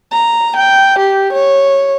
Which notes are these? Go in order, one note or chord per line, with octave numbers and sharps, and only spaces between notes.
A#5
G5
G4
C#5